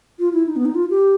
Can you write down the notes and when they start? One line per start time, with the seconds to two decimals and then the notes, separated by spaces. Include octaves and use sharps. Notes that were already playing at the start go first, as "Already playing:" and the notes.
0.19 F4
0.33 E4
0.47 D#4
0.56 B3
0.65 D#4
0.75 F4
0.90 G4